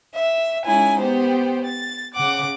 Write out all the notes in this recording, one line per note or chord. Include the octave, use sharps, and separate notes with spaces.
E5
G#3 C#4 D#4 E4 G#5
B3 G4 C5
A6
C#3 F#5 D6